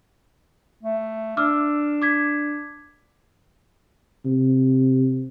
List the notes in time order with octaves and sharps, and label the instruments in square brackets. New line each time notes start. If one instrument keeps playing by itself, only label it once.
[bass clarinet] A3
[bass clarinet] D4 [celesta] D6 E6 F6
[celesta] D6 G#6 B6
[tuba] C3